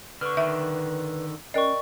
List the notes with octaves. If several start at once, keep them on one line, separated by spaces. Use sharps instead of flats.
D3 B4 C#6 F6
D3 D#3 E5
C#4 A#4 D5 D#5 G5 C#6